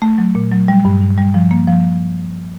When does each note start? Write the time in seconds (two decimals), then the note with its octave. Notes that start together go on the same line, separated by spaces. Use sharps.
0.02 A3
0.18 F#3
0.35 A#2
0.51 F#3
0.68 G3
0.85 G2
1.01 G2
1.18 G3
1.34 F3
1.51 A#3
1.68 F3